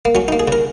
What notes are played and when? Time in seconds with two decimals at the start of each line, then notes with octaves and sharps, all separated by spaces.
0.05 A#3
0.15 F#3 C#4
0.28 D#4
0.32 A#3
0.40 G#4
0.48 C#3 A#4